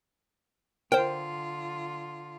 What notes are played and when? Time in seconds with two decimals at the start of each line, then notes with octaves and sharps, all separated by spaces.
0.92 D3 F4 A#4 C5 G5